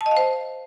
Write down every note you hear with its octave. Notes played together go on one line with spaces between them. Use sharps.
A5
D#5
F5
C5